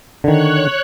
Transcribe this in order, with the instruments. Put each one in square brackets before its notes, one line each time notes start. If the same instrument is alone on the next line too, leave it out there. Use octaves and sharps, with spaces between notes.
[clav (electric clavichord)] D3 D#3 [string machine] C#5 F#6